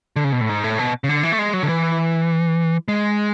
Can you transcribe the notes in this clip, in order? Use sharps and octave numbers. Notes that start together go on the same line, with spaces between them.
D3
C#3
B2
A2
G#2
A2
B2
C#3
D3
E3
A3
G#3
F#3
D3
E3
G#3